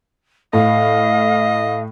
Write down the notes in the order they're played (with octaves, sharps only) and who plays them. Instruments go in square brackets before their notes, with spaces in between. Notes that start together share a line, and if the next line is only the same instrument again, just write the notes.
[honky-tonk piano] A2 [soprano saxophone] D#5 [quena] F5